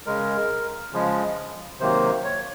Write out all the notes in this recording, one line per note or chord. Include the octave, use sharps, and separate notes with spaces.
C#3 G#3 A#4
C#3 F3 G#3
C3 D#3 F#3 A#3 C5
C#5